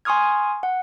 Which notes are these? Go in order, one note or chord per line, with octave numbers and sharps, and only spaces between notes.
G#5 C6 C#6 D#6 F6 G#6
F#5